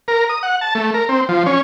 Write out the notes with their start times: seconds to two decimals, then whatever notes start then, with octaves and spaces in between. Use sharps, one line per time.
0.08 A#4
0.29 D#6
0.43 F#5
0.61 A5
0.75 A3
0.94 A#4
1.09 C4
1.29 F3
1.46 C#4